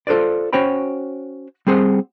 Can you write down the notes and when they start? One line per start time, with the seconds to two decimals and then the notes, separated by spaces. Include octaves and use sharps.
0.07 F4 A4 B4 C5 D5
0.53 C#4 F#4 C5 C#5 G5 B5
1.67 G3 C4 G#4 C5 F#5